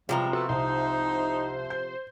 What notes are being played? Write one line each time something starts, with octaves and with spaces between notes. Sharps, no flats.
E2 C3 F3 G3 G#3 F4 G5 A#5
B3 F#4 A4 B4
C2 D#4 C5
G6